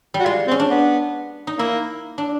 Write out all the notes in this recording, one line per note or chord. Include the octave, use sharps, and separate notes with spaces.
G3
F#4
G#3 F4
C4
C#4
D4
B3
D#4
A#3 E4
D4